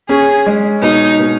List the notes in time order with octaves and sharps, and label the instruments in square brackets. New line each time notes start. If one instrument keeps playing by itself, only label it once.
[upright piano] C#4 [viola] G#4
[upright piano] G#3
[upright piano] B2 [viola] D#4
[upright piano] B2